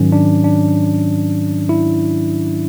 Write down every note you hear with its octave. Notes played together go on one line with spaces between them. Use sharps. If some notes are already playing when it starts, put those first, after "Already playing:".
Already playing: G#2 D#3 F#3 C#4
D4
D4
E4